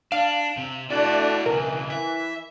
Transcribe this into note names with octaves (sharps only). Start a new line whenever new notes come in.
D4 F5
C3
A3 D4 E4 F#4 D5
B1 C#3 E3 A#4
E5